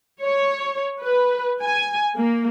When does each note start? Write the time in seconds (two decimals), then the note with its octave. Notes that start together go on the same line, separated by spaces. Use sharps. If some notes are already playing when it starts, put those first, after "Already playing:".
0.23 C#5
1.02 B4
1.62 G#5
2.17 A#3